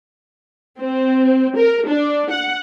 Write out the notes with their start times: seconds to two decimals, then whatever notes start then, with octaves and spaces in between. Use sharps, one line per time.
0.80 C4
1.57 A#4
1.88 D4
2.31 F#5